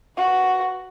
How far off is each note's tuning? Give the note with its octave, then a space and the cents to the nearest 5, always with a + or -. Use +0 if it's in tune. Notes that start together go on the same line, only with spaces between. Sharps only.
F#4 +0 B4 +0